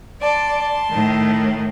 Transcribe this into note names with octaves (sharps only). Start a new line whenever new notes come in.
D5 A5 C6
A2 D#3